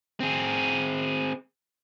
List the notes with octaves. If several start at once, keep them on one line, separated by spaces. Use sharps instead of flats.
C4 G#4